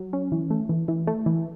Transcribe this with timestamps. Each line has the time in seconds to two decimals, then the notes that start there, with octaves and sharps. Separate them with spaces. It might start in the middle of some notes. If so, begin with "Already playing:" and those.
Already playing: F#3
0.13 C#4
0.32 E3
0.50 A3
0.69 E3
0.88 E3
1.07 A3
1.26 E3